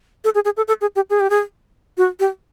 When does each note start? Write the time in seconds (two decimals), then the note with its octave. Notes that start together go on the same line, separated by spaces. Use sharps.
0.24 A4
0.35 G#4
0.45 G#4
0.57 A4
0.68 A4
0.81 G#4
0.96 G4
1.10 G#4
1.20 G4
1.30 G#4
1.97 F#4
2.20 G4